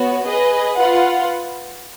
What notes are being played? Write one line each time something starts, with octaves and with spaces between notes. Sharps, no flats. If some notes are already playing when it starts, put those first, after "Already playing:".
Already playing: B3 F#4 C#5
G#4 B4 D#5
F4 B4 F#5